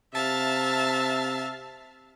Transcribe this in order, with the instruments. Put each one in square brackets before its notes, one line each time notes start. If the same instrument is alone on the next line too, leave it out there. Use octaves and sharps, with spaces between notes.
[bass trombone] C3 [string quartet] E5 F5 A5